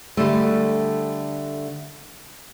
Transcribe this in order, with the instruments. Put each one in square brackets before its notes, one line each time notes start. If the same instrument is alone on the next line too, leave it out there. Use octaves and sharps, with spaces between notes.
[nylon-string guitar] D3 G3 A3